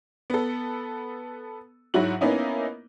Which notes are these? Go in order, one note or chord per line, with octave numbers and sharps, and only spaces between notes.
B3 A4
G#2 F#3 E4 F#4 F#7
A#3 B3 C#4 D#4 E4